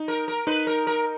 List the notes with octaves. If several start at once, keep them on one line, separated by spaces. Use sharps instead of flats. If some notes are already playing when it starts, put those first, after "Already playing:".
Already playing: D#4
A#4
A#4
D#4 B4
A#4
A#4